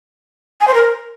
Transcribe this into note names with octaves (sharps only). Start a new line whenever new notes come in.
G#5
C5
A#4